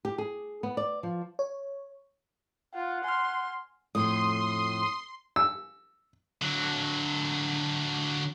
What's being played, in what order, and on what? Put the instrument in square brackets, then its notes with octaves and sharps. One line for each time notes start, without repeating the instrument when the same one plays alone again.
[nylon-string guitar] G4
G#4
B3
D5
F3
[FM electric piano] C#5
[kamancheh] F4 [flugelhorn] F#5
[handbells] G#5 F6 [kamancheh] C6
[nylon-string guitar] F2 A2 [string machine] C6 [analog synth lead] D#6
[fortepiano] E6
[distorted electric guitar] D3 F#3